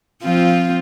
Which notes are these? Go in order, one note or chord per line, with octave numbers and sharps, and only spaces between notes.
F3 C4 F4